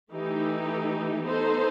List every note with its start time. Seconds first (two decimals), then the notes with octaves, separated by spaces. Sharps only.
0.12 E3 A3 D#4 G4
1.24 B3 D#4 A4 C5